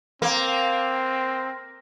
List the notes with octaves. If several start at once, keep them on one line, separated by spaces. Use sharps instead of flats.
A#3 C4